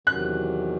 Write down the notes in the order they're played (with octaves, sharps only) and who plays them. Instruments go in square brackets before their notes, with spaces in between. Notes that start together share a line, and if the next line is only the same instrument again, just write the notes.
[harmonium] E2 C3 D#3 F#3 [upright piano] F#6